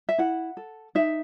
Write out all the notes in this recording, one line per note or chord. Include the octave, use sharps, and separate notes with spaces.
E5
E4 F#5
A4
D#4 E5